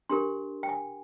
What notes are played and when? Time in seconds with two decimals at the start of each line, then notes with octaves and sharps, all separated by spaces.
0.09 D4 G4 A#4 C6
0.63 G5
0.69 G#5